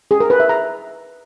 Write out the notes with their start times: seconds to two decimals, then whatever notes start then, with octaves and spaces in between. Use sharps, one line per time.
0.11 G#4
0.20 A#4
0.30 B4
0.40 E5
0.49 A#5